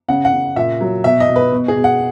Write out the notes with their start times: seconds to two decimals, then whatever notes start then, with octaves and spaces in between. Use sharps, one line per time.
0.09 C#3 F#5
0.25 F#5
0.33 C#3
0.56 A#2 E5
0.81 F#3
1.04 B2 E5
1.20 D#5
1.28 B2
1.36 B4
1.52 B2
1.68 G#4
1.76 B2
1.84 F#5